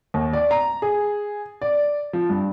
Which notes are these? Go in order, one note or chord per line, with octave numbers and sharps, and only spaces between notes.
D#2
D5
A#5
G#4
D5
F3
G2